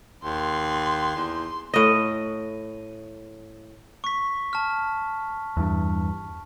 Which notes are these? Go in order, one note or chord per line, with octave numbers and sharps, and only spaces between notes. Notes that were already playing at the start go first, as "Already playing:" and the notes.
D#2 C6
E2
A2 D#5
C#6 B6
A5 F6
E2 G2